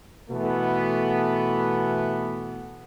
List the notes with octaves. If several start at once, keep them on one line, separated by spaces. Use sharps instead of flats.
B2 E3 A3 B3